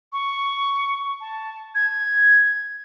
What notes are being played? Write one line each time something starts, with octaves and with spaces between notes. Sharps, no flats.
C#6
A5
G#6